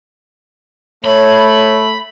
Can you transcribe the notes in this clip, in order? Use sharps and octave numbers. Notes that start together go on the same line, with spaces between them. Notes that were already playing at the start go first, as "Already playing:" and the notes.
A3 C#5 B5